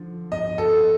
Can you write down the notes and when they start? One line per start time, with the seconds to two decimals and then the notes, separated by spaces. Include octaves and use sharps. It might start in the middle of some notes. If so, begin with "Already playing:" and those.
Already playing: D3 F3
0.32 D#5
0.58 A4